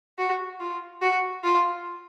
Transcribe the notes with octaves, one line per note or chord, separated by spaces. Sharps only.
F#4
F4
F#4
F4